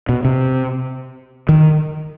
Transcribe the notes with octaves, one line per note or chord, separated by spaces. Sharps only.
B2
C3
D#3